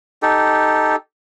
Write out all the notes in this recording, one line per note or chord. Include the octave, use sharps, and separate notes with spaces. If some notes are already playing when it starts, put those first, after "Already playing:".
D#4 G4 A4